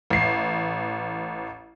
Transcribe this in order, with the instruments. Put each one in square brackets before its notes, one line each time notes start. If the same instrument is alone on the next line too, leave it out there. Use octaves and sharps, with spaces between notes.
[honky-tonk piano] A1 C7